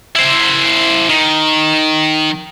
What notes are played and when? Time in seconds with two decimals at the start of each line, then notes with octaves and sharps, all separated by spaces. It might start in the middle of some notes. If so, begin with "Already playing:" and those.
0.16 E4 C5
1.09 D#3